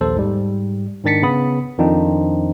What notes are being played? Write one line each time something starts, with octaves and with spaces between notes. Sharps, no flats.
A#1 D#2 A4 C5
G#2 G3
G#2 D#3 D4 A6 B6 C#7
C#3 B3 B5 D#6
F2 D#3 F3 C4 D4 D#4